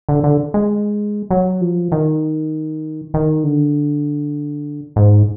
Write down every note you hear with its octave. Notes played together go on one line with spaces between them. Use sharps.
D3
D3
G#3
F#3
F3
D#3
D#3
D3
G#2